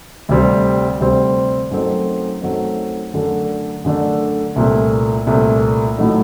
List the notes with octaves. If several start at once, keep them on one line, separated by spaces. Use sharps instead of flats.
D2 C3 G3 C4
D2 C3 G3 C4
F#2 F#3 A3 C4 D#4
F#2 F#3 A3 C4 D#4
F#2 D3 A3 D4
F#2 D3 A3 D4
C2 A#2 A3
C2 A#2 A3
A2 F#3 A3 D#4